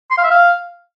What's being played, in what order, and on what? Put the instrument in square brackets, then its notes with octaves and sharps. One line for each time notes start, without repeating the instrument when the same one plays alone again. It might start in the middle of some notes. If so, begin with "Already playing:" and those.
[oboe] C6
F5
E5
F5